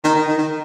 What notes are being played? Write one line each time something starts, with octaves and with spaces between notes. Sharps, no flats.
D#3 D#4
D#3
D#3
D#3